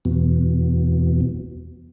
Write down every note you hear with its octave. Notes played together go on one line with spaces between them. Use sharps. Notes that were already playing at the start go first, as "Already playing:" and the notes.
E2 B2